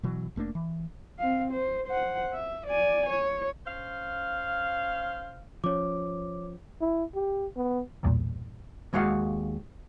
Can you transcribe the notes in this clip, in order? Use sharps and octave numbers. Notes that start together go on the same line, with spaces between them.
B2 E3 F#3
F1 A3 A#3 D4
E3
C4 F5
C5
C5 F#5
E5
D5 G#5
C#5
C#4 C5 F5
F3 C#4 C#5 D6
E4
G4
B3
B1 E2 G2 A#2
D#2 G#3 F#4 F5 F#5